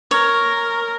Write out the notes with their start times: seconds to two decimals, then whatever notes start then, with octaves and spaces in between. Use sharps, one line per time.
0.11 A#4 C#5